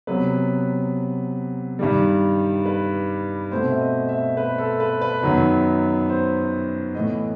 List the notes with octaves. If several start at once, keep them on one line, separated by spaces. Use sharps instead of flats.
C3 F#3 B3 B4
G2 D#3 G3
B4
B2 A3 C4 C5
E5
D#5
E5
B4
A4
B4
B4
F#2 D#3 F#3 B3
C5
A2 E3 B3 D#5